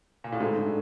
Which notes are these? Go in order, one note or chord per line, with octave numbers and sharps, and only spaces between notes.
A#2
A2
G#2 A3
D4